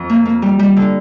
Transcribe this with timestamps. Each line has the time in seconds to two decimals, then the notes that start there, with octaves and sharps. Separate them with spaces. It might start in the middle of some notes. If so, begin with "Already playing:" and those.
Already playing: F2
0.10 A#3
0.25 A#3
0.42 G3
0.59 G3
0.77 D3